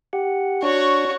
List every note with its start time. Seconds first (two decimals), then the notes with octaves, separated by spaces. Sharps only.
0.13 G4 F#5
0.63 D4 F#4 C#5